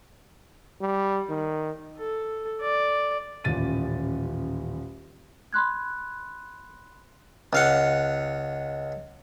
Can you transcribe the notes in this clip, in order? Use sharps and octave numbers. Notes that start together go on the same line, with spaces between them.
G3
D#3
A4
D5
D#1 A1 A6 D#7
B5 C6 F#6 G#6
C#2 F5 F#5